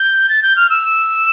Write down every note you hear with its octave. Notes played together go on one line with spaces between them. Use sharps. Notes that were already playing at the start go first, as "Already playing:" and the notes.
Already playing: G6
A6
G6
F6
E6